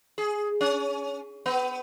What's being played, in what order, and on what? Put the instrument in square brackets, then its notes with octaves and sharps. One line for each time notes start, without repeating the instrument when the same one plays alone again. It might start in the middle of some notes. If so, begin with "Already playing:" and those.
[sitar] G#4
C#4
B3